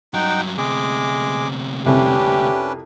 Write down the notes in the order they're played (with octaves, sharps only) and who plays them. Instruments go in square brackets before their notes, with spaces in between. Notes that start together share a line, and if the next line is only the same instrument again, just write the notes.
[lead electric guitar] G2 F#3 [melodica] D#4 F#5 G5
[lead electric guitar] D2 C3 [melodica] G#3 G#4 D6
[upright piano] C2 F2 [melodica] C#4 D4 B4 [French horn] G4